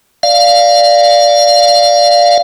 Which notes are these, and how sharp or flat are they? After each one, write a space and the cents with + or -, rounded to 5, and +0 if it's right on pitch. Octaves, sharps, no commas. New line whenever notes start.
D5 +0 F5 +0